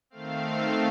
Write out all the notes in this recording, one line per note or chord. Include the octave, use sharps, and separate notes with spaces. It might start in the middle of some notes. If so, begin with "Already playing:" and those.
D#3 A3 C4 F5